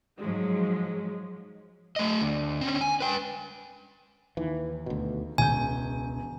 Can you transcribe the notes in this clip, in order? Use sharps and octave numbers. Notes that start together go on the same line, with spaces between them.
G#2 F3 F#3 G#3
A3 D#5
D2
C4 C#4
G#5
B4 G5
D#2 E3
D2 B2
E1 C#2 G#5 G6